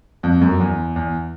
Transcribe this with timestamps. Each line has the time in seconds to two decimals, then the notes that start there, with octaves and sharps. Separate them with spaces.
0.23 F2
0.41 F#2
0.60 E2
0.96 E2